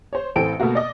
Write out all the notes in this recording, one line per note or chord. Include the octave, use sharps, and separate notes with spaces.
C5 C#5
A1 E3 C4 A4 G5 D7
B2 A3 A#3 F#4
D5 D#5